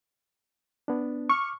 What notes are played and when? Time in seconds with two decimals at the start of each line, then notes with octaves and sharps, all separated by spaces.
0.88 B3 D4
1.29 C#6 D6 F6